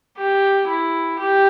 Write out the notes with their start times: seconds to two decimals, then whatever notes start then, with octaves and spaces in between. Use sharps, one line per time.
0.18 G4
0.68 E4
1.19 G4